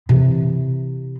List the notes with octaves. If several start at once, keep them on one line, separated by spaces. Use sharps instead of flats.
C3 E3